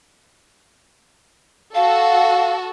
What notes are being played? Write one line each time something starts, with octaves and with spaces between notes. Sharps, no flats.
F#4 A4 F5